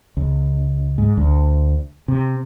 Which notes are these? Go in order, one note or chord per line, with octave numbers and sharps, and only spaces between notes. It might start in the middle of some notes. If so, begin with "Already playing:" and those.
C#2
G#2
D2
C3